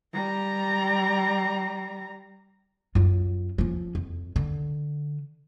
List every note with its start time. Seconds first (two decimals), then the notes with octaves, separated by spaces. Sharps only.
0.13 G3 A#5
2.95 F#2 F4
3.58 F3 C#4
3.95 F2
4.36 D3